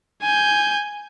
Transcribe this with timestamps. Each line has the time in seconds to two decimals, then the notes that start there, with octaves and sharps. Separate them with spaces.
0.23 G#5 G6